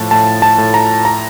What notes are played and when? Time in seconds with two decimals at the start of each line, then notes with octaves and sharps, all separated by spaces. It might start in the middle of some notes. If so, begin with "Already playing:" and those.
Already playing: A2 F3 A5
0.11 A2 A5
0.42 A5
0.58 A2
0.74 A#5
1.05 A#5